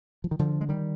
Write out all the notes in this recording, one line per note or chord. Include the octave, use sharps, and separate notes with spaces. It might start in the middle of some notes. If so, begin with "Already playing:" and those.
F3
D#3
D3 F3
G#3
D#3 G3